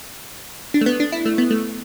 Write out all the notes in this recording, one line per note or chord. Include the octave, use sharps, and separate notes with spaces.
D4
A3
B3
D4
E4
A3
B3
A3